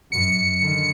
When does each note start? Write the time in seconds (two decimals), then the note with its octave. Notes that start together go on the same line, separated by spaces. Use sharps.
0.12 F#2 C#7
0.60 D3 D#3